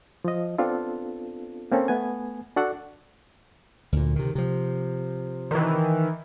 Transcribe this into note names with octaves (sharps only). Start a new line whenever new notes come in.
F3 D#5
B3 C4 D4 F4 A4
A#3 C4 C#4 A4
A3 B3 G#5
D4 F#4 A4 F#5
D2 A#2
C3 D#3
C3 F3
D#3 E3